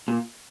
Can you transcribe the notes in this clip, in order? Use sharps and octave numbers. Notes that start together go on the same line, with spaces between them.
A#2